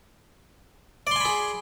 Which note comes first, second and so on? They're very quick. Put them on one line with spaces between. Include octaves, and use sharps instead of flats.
D5 C6 G#5 B5 G#4